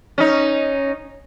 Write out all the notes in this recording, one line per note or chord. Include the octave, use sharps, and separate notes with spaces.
C#4 D#4